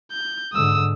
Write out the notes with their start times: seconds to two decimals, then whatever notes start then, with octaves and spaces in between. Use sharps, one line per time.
0.11 G6
0.53 G#2 D3 D#6 E6